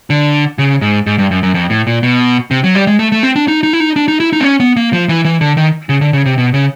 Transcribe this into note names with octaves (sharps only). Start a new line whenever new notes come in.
D3
C#3
G#2
G#2
G2
F#2
F#2
F2
A2
A#2
B2
C3
F#3
G3
G#3
A3
A3
C4
D4
D#4
D#4
E4
D#4
D4
D#4
E4
D#4
C4
C#4
B3
A#3
F3
E3
E3
D3
D#3
C#3
D3
C#3
C3
B2
C#3